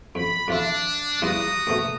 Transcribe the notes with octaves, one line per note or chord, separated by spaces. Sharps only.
F2 B5
F2 D4 F4 E5
E2 G3 F4 F#4 A#5 D#6
D2 B2 A3